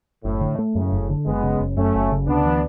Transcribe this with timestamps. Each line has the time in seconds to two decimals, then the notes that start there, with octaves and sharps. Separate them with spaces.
0.24 F#1 A2
0.41 D3
0.58 A3
0.75 F#2 A2 C#3
0.92 F#1
1.10 D3
1.26 F#1 G#3 B3
1.43 C#3
1.60 F#1
1.77 F#2 A3 C#4
1.95 F#1
2.12 C#3
2.27 D2 B3 D4
2.46 E3